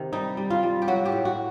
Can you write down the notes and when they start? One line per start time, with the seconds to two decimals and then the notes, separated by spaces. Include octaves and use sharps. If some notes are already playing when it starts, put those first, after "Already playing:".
Already playing: C3 D#3
0.13 G3 D#4
0.37 G3
0.50 F4
0.63 G3
0.82 G4
0.88 F#3 F#4
1.05 G4
1.12 A2
1.25 F#4